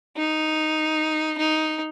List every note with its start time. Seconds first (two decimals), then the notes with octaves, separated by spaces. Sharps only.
0.17 D#4
1.38 D#4